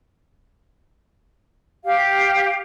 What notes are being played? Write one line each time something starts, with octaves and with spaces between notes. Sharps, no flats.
G4 F5